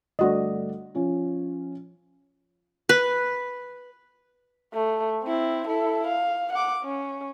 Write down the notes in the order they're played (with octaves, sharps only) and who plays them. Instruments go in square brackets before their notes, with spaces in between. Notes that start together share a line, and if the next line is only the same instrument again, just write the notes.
[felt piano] G1 A3 D5 [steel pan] F#4 D#5
[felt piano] F3 C#4 F4
[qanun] B4
[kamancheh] A3
C4 E4
E4 A4
F5
F#5 D6
C#4